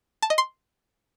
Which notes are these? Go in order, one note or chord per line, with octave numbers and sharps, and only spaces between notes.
A5
D#5
C6